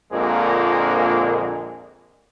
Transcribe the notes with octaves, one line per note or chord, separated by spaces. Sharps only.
A#1 F2 A#2 D3 G#3 A#3